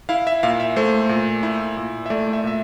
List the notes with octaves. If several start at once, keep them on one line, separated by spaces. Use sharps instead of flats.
E4 F5
E5
A#2 F5
E5
A3 C5
A#2
E4
A#2
E5
A3 D5
E5
A#2 E5